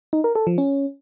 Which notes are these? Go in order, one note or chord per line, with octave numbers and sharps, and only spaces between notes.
D#4
A#4
A4
F3
C#4